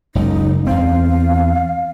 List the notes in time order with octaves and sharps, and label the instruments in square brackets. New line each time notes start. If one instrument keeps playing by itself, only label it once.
[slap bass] F#1 C#2 [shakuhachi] D#4
[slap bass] E2 C4 [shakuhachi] F5